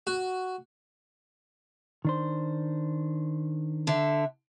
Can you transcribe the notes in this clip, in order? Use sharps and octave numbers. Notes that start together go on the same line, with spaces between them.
F#4
D#3 D4 C5
D3 E5